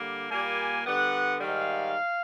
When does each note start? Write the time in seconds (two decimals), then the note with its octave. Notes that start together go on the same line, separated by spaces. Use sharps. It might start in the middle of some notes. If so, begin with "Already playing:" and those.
Already playing: D3 G3 A#3
0.30 A#2 G3 A#3 G#5
0.85 D3 G3 B3 F#5
1.40 G#2 D#3 G3 F5